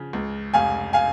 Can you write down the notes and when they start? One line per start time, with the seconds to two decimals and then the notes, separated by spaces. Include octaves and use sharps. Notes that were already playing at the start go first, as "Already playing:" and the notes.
Already playing: C#3 F3
0.13 C#2
0.54 F1 F5 G#5
0.93 F5 G#5